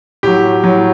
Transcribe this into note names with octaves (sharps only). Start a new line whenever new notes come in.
A2 F#3 G4
A2 F#3